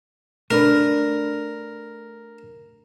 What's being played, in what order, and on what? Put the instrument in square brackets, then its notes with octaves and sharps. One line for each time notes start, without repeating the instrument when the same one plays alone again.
[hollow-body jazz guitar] A3 D4 B4 [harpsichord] A#4